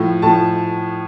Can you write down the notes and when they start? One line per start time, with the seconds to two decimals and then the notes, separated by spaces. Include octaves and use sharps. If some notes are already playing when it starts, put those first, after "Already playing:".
Already playing: A2 F3
0.22 A2 F3 A5